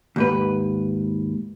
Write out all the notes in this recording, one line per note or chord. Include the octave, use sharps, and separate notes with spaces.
D#2 G#2 B4